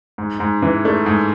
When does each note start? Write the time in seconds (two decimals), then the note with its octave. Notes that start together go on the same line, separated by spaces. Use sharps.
0.18 G#2
0.40 G#2
0.62 E3
0.85 A3
1.06 G#2